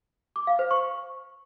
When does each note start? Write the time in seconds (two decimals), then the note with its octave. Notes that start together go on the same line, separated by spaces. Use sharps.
0.36 D6
0.47 F5
0.59 C5
0.71 C#6